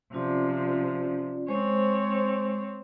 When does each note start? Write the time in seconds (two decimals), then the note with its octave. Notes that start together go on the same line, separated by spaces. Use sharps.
0.13 C3 F3 C#4 F4 D5
1.48 G#3 C4 C5 C#5